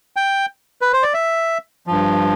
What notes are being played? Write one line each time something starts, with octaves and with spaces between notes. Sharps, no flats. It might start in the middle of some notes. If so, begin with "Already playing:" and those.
G5
B4
C5
D5
E5
G2 F3